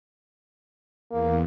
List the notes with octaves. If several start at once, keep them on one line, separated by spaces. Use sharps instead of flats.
E2 A#3